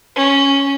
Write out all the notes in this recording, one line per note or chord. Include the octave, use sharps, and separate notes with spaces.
C#4